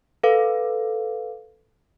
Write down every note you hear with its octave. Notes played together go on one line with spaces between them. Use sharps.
A4 B4 F5